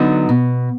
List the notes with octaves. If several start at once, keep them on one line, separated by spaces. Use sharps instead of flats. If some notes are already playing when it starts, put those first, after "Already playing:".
Already playing: D3 F#3 B3 D#4
B2